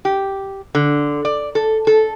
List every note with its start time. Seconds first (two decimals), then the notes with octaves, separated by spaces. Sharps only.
0.05 G4
0.75 D3
1.25 D5
1.55 A4
1.87 A4